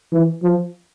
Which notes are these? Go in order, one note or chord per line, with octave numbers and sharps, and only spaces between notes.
E3
F3